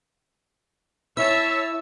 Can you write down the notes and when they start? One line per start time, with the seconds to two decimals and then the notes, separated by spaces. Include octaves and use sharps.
1.17 E4 C#5 E5 A5 E6